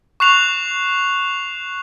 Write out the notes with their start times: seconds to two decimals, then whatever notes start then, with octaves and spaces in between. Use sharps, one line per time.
0.20 C#6 F#6 C7 F7